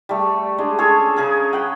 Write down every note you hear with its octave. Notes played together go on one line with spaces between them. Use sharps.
G3 A3
G#3 D4
C#4 G#4 A4 C#5
C#3 G#4 A#4
F#5 G5 B5